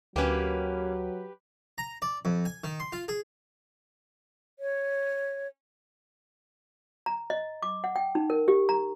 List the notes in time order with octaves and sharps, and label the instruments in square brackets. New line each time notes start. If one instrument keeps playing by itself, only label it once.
[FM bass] D2 [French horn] F#3 [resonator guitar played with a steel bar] A#3 C#4 [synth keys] G4 B4
[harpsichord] A#5
D5
F2
G#5
D#3
C6
F4
G#4
[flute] C#5
[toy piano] A#5
D#5
D6
F#5
G5
D#4
A#4
G4
A#5